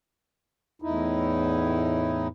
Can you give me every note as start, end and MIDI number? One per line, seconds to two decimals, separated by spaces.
0.82 2.28 40
0.82 2.28 45
0.82 2.28 63
0.82 2.28 64